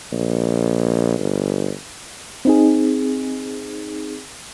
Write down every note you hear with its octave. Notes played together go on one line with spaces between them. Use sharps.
A#1
G1
C4 D#4 G#4